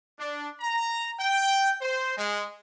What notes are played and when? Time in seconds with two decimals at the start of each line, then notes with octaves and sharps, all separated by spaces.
0.18 D4
0.60 A#5
1.19 G5
1.81 C5
2.16 G#3